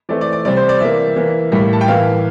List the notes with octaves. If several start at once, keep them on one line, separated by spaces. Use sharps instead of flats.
E3 A3 C4 D5
D5
D5
C3 G3 C4 D5
C5
D5
E3 A#3 E5
E3 A#3
A2 G3 A#3
A5
G5
E3 A#3 F5